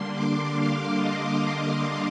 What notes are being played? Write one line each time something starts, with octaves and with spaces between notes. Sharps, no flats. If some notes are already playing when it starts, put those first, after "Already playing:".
Already playing: D3 G3 A#3 D4 C6
D6
F5
D#5
F5